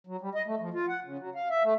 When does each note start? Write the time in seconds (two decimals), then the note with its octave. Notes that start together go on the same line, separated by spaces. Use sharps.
0.07 F#3
0.21 G3
0.35 D#5
0.47 A3
0.60 F3
0.74 F4
0.88 F#5
1.04 C#3
1.19 F#3
1.35 F5
1.50 E5
1.63 A3